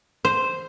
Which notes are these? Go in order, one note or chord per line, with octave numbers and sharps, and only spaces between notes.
C5